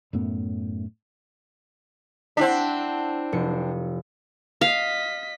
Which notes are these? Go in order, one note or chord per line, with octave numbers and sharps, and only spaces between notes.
F#2 A2 A3 B3
C4 D4 E4 F#5 B6
F1 C#7
D#5 F5 B6